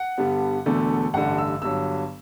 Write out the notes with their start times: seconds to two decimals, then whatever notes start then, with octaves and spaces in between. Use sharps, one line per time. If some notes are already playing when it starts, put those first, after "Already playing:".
Already playing: F#5
0.18 G2 D3 G3 B3
0.66 E1 E2 D3 A3
1.14 A1 G2 D3 F#5
1.38 E6
1.62 G1 G2 F#3 E6